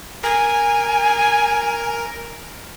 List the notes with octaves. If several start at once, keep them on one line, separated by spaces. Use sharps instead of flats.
A#4 G#5